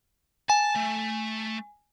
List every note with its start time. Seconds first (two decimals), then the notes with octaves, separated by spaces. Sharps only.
0.50 G#5 A5
0.76 A3